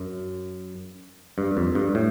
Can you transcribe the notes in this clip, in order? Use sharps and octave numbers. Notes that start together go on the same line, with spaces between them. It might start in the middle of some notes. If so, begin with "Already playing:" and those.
Already playing: F#2
G2
F2
G2
A2